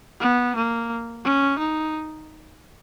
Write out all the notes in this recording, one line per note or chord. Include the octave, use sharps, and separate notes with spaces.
B3
A#3
C#4
D#4